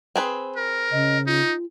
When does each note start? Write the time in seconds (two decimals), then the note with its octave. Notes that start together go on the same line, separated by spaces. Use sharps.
0.16 C4 G#4 B4
0.56 A#4
0.91 C#3 D#5
1.27 D#4 F4